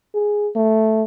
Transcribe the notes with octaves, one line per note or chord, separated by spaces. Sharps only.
G#4
A3